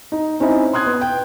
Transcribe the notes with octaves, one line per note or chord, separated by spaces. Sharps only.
D#4
C4 C#4 D#4 E4
C6 D#6 F#6 G#6
B3
G5